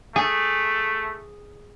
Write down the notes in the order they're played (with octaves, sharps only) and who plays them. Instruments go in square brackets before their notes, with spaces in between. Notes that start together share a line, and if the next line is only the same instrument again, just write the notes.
[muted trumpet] A3 [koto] G#4